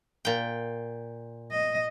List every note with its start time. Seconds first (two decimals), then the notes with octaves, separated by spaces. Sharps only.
0.25 A#2 G5
1.51 D#5